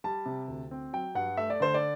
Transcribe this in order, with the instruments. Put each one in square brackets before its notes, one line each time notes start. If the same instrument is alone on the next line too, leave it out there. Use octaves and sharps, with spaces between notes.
[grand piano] G3 A5
C3
D2
C4
F#3 G5
G2 F#5
A3 E5
D5
D3 C5
D5